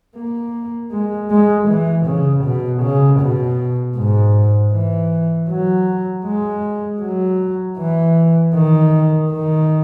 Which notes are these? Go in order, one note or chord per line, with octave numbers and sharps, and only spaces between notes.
A#3
G#3
G#3
E3
C#3
B2
C#3
B2
G#2
E3
F#3
G#3
F#3
E3
D#3
D#3